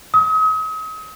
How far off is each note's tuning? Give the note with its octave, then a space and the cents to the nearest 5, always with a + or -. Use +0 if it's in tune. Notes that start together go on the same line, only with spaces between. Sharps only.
D#6 +40